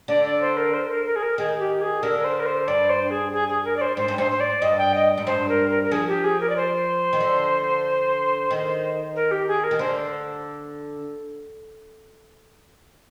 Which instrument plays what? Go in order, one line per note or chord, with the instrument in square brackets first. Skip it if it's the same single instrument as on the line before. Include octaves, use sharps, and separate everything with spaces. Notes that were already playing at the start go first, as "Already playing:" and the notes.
[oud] D3 [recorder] D5
[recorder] D5
C5
A#4
C5
A#4
A#4
G#4
A#4
[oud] D#3 [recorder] G#4
[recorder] G4
G#4
[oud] D3 [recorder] A#4
[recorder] A#4
C5
A#4
C5
[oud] G2 [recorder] D5
[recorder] C5
G#4
G#4
G#4
A#4
D5
C5
[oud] G#2 [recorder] C5
[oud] G2
[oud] G#2 [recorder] C5
[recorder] C5
D5
[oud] G2 [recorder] D#5
[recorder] G5
D#5
[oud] G#2
[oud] G2 [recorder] C5
[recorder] A#4
A#4
A#4
[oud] F3 [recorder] G#4
[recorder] G4
G#4
A#4
D5
C5
[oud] D#3
D3
D#3
[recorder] A#4
G4
G#4
A#4
[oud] D#3
[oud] D3 [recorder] C5